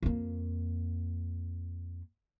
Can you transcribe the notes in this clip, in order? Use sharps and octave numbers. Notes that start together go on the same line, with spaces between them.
F2 A#3